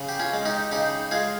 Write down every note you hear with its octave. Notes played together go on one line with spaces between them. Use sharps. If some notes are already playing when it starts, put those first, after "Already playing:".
Already playing: C#3
G4
C#4 F4
G#3
D#4 G4
C#3 D#4 G4
G#3 F4 G#4